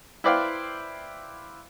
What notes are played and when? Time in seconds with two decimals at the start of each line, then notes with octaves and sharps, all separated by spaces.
0.24 E4 B4 C5 D5 F5 G5